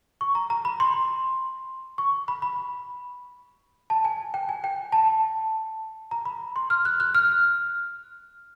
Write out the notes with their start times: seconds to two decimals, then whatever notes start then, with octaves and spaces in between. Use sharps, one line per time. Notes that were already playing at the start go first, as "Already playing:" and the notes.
0.21 C#6
0.35 A#5
0.50 A#5
0.65 B5
0.80 C6
1.98 C#6
2.28 B5
2.42 B5
3.90 A5
4.05 G#5
4.34 G5
4.49 G#5
4.64 G5
4.92 A5
6.11 A#5
6.25 B5
6.56 C6
6.70 F6
6.85 F#6
7.00 F#6
7.15 F6